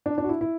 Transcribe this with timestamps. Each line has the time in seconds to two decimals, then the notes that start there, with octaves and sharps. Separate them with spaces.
0.06 D4
0.18 D4
0.24 F#4
0.29 E4
0.41 E4